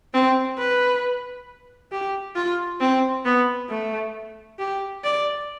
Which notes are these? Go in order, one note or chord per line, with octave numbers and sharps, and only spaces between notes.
C4
B4
G4
F4
C4
B3
A3
G4
D5